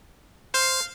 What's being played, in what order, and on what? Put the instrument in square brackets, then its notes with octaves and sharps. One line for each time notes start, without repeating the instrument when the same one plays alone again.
[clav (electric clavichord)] C5 [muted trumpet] F5